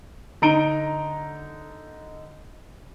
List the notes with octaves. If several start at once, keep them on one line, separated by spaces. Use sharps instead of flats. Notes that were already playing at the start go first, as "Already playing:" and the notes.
D3 D#4 A#5 D7 D#7 G7